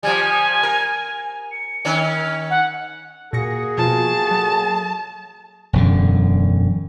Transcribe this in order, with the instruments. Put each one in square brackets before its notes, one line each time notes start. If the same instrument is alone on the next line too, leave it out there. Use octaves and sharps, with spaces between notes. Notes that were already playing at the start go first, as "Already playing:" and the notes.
[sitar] F3 G3 [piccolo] G#5
[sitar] A#4
[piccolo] C#7
[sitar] D#3 C#4
[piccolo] F#5
[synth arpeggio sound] A#2 A#6 C#7 [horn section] A#3 F#4 G#4
[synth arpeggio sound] B2 F3 F4 [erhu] A5
[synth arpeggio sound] F#3 A4
[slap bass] E1 F#2 D3